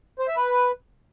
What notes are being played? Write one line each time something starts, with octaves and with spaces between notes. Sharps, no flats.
C5
E5
B4